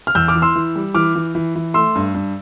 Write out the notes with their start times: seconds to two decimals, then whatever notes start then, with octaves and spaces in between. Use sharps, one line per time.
0.07 F6
0.15 E2 E6 G6
0.28 D6 F6
0.35 E3
0.42 C6 E6
0.56 E3
0.76 G3
0.95 E3 D6 F6
1.16 E3
1.35 E3
1.56 E3
1.74 A3 C6 E6
1.95 G2
2.14 G2